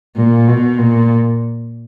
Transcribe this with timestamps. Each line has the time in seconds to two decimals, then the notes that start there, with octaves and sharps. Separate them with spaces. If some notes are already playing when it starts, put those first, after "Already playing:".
0.16 A#2
0.47 B2
0.78 A#2